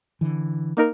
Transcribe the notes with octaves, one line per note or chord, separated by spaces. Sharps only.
D3 E3
A#3 D#4 A#4